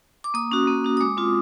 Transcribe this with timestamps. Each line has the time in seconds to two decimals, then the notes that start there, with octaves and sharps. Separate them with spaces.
0.24 D6
0.34 A#3 D#6
0.51 C#4 F#4
0.67 A#3
0.84 C#4 F#4
0.97 D#6
1.00 G#3 D6
1.17 C4 F4